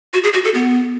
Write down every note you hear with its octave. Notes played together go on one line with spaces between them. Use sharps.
F#4
G#4
F#4
A4
B3